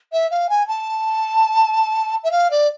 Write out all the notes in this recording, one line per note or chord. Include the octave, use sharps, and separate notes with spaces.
E5
F5
G#5
A5
E5
F5
D5